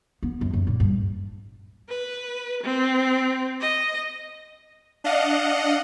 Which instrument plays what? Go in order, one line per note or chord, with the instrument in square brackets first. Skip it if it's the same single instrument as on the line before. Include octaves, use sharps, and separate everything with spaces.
[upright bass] B3
F#2
F#2
A#2
G2
[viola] B4
C4
D#5
[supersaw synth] D4 D#5 F5 F#5